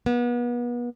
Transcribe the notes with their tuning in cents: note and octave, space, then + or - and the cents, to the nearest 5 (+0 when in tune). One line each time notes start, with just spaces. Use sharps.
B3 -35